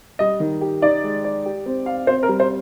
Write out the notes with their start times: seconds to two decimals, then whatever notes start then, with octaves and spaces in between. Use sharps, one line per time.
0.19 G3 D#5
0.40 D#3
0.61 G4
0.82 D#4 D5
1.03 G#3
1.24 D5
1.46 G4
1.66 C4
1.86 F5
2.07 C4 C5
2.23 A#4
2.28 G3
2.40 C5